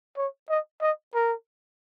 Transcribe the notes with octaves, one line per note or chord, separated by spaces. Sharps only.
C#5
D#5
D#5
A#4